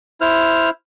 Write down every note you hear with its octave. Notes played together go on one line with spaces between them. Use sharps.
E4 C5 F6